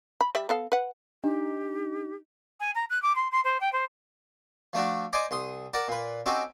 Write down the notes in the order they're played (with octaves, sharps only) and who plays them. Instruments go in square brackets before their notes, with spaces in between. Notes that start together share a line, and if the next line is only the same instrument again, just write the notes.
[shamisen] B5
G3 D5 E5
B3 A4 F5
B4 F#5
[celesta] D4 [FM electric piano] D#4 [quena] G4
[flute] G#5
A#5
F#6
D6
C6
C6
C5
G5
C5
[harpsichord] F3 A3 D4 F#4
C5 D5 D#5 G#5 C6 D6
C2 C6 D#6
A#4 D5 F#5 A5
A#2 B4
C4 C#4 D#4 F#4 G4 A4